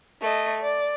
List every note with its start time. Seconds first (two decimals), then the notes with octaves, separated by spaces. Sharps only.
0.21 A3 D#5
0.62 D5